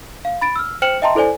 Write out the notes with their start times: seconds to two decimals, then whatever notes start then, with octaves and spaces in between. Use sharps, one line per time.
0.25 F5
0.41 B5 A6 D7
0.56 E6 F6
0.82 C5 G5 F6 C#7 E7 F#7
1.02 D#5 E5 G5 A5 A#5 C6
1.15 E4 A4 C5 D5 G#5